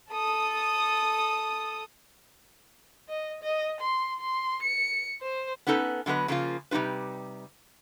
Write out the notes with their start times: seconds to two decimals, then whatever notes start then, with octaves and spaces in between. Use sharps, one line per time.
0.11 A4 D#6
3.08 D#5
3.43 D#5
3.81 C6
4.20 C6
4.63 C#7
5.21 C5
5.67 B3 C#4 D#4 A4 B4
6.06 D3 F#3 B3 B4 D#5
6.28 C#3 F3 A#3 F4
6.71 C3 G3 D#4 F4 B4